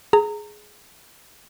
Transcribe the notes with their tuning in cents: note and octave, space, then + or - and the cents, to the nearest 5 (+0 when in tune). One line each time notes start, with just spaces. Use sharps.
G#4 +15 A#5 -25